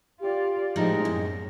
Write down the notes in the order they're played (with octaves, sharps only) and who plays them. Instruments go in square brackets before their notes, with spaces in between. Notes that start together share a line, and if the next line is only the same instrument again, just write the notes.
[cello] F4 D5 [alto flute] G4
[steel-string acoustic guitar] A2 F3 G3 [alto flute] G#3 [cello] D#4 A#4
[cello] F#2 [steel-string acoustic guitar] B2